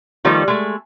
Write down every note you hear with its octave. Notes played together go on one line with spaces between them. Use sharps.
D#3 F3 G3 A3 D#4
G#3 A3